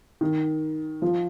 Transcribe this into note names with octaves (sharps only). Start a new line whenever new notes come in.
D#3
F3